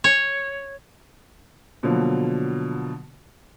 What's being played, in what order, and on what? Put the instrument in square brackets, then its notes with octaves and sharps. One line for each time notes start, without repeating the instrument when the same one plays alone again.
[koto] C#5
[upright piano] B2 D3 F3 F#3 A#3